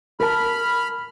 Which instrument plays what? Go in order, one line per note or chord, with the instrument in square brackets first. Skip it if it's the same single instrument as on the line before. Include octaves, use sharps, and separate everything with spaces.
[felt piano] A#4 A5 [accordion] B5 F6